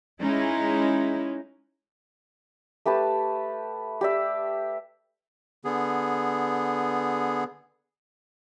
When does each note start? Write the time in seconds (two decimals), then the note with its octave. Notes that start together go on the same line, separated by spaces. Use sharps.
0.21 G#3 C#4 D#4 E4
2.86 A3 G4 B4 A5
4.01 G4 D5 E5
5.65 D3 B3 G#4